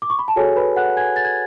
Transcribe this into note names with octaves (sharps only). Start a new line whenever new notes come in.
D6
C#6
B5
A5
F#4 G#4 A4 C#5 G#5
B4 B5
F#5 F#6
G#5 G#6
A6
G#6